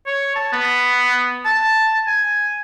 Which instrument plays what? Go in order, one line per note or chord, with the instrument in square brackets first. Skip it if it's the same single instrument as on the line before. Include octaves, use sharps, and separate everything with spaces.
[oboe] C#5
A5
B3
A5
G#5